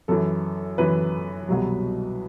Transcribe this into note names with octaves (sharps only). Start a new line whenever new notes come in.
F#2 E3 A4
F#2 E3 B4
C2 B2 F#3